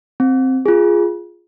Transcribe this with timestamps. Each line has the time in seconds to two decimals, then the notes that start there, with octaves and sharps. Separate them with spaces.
0.20 C4
0.66 F4 G#4